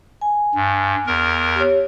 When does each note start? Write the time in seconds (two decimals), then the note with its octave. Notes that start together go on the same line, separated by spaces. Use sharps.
0.21 G#5
0.55 G2
1.07 E2 A#4
1.56 G4 C#5